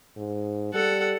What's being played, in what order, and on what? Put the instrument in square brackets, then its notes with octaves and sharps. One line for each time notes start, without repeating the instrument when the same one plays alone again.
[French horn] G#2
[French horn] G3 [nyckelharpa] A4 F#5